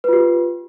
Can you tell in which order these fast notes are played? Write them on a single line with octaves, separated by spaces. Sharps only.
B4 F4 G4